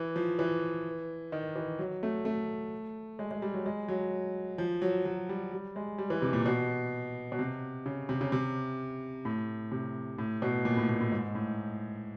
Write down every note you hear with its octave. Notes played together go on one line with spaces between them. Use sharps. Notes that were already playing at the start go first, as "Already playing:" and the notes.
Already playing: E3
F3
E3
D#3
E3
F#3
A3
A3
G#3
G#3
G3
F#3
G#3
F#3
F3
F#3
F#3
G3
G3
G#3
G3
E3
C3
A#2
B2
B2
C3
C#3
C3
C#3
C3
A2
C3
A2
B2
A#2
A2
A#2
A2
G#2
A2